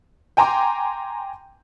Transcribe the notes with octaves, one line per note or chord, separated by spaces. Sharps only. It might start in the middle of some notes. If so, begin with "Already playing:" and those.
G5 G#5 A#5 C6 D6